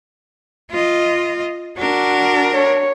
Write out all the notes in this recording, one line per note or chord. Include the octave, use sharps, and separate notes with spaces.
F4 D#5
D4 F#4 A#4
C#5